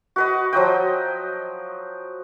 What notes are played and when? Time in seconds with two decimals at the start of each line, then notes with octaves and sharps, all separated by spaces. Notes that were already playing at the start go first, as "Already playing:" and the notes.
0.16 F#4 B4 D#5
0.53 F3 F#3 D#5 G5